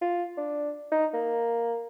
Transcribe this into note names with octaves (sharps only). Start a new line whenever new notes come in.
F4
D4
D#4
A#3